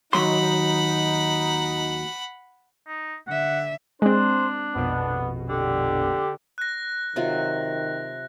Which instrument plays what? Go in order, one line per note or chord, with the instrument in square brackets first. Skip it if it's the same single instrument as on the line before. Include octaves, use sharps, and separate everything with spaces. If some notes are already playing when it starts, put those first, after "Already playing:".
[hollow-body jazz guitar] D#2 F#3 C6 [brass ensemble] D#4 [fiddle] F#5 B5
[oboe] D#4
[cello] D3 E5 [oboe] F#5
[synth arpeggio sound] G#3 C4 [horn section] D4 [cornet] C5
[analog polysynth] A#1 F2 B2 [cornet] B3
[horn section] D3 [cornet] G4
[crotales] F#6 A#6
[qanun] C3 F#3 F4 [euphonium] D#3